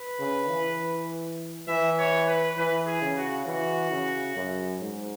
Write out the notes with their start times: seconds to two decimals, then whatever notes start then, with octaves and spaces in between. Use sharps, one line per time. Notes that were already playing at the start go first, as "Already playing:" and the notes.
Already playing: B4
0.19 C#3
0.49 E3
1.68 E3 E5
1.99 C#5
2.28 B4
2.58 E3 B4
2.87 G#4
3.02 C#3
3.17 F#4
3.46 E3 F#4
3.91 C#3
4.36 F#2
4.81 G#2